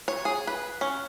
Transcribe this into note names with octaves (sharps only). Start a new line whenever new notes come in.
C#5
G#4
B4
C#4